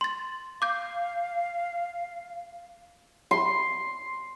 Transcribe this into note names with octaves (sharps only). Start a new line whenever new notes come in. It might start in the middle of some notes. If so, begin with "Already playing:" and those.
C6 A6
F5 D6 G6
C6